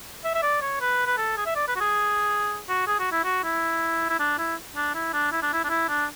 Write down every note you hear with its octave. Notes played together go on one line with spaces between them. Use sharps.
E5
E5
D5
C#5
B4
B4
A4
G#4
E5
D5
B4
F#4
G#4
F#4
G#4
F#4
E4
F#4
E4
E4
D4
E4
D4
E4
D4
E4
D4
E4
D4
E4
D4